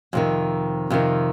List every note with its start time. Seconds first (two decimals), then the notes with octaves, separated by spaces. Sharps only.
0.13 F2 C3 D#3
0.90 F2 C3 D#3